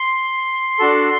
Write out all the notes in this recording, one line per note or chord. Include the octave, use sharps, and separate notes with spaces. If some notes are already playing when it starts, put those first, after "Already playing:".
Already playing: C6
D4 F#4 A4